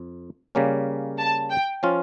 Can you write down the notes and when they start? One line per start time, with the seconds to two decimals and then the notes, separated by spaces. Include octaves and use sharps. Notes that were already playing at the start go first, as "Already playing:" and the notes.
Already playing: F2
0.55 C#3 G3 A#3 C#4
1.19 A5
1.50 G5
1.83 F3 C#4 F4